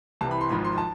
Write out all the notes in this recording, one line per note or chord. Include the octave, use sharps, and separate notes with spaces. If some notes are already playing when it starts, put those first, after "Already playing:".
C2 C3 E3 A5
B5
C6
G#1 G#2 F3 B5
C6
A5